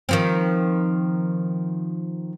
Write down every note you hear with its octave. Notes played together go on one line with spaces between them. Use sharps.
D#3 F3 C4